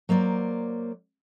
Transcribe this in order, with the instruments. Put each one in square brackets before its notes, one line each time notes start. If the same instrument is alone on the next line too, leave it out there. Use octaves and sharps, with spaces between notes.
[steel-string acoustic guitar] F#3 A#3 C5 D5